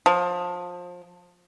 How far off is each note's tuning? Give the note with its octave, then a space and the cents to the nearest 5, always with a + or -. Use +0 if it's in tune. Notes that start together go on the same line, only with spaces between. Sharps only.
F3 +25